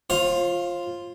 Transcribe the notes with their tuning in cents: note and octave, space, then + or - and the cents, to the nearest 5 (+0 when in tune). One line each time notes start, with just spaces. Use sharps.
F4 +0 C5 +40